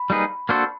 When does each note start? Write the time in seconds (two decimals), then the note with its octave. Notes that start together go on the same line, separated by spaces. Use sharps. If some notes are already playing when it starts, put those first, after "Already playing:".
Already playing: B5
0.10 G3 A#3 D#4 G#4 B4
0.49 A#3 D4 F#4 A4 C5